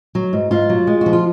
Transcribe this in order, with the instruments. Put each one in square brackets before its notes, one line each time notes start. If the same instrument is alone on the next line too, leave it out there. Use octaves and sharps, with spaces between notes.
[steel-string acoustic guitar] F#3
G#2
G#2 F4
F#3
G#3
F3 F#4
F4